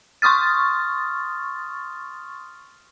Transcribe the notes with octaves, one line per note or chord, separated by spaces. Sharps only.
C6 C#6 D#6 F6 A6